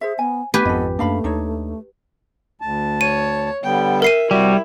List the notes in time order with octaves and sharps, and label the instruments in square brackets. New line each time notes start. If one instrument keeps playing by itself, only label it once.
[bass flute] G#4 [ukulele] C5 E5
[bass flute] B3 [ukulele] G#5
[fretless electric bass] A3 [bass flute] B3 [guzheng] G4 B4 G#5
[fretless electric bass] G#1 F2 [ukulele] A4 D#5
[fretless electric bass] F#2 A#3 [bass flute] A3 [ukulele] D4 F5 B5
[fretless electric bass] D#2 [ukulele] D4 D#4 C#5
[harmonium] D2 A5
[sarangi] C#5 [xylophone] D#7
[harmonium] D3 G3 B3 [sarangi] G5
[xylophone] A#4 C7 D#7 [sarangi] E5
[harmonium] C3 F#4 [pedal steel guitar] G3 [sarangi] E4